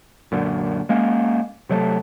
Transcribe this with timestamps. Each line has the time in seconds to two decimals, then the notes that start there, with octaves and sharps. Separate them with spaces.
0.32 F#2 A#2 D3
0.89 G#3 A#3 C#4
1.69 C3 F#3 G#3 A3